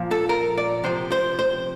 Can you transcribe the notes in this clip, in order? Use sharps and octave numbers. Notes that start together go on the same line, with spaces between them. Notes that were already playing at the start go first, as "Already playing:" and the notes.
Already playing: A#2 F3
A4
A#4
D5
C3 F3 C5
C5
C5